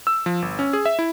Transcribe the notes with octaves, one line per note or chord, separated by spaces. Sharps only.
E6
F3
G1
C#4
G#4
E5
E4